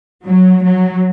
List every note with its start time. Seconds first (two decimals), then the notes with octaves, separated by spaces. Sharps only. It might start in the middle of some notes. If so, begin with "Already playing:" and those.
0.25 F#3
0.64 F#3